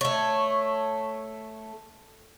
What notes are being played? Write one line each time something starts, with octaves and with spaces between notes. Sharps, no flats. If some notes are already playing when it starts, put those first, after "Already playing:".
A3 C#5